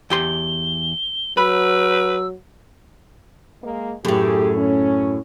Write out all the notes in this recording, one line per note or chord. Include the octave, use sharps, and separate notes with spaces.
E2 G4 C6 G7
F#3 B4 B5 E6
G#3 A#3
F#2 A2 G4 G#4
C#4